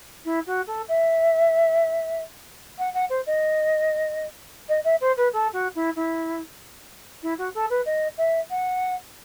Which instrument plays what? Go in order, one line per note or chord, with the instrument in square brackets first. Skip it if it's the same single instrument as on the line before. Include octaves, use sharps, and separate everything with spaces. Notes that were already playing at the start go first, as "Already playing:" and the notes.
[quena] E4
F#4
A4
E5
F#5
F#5
C5
D#5
D#5
E5
C5
B4
A4
F#4
E4
E4
E4
F#4
A4
B4
D#5
E5
F#5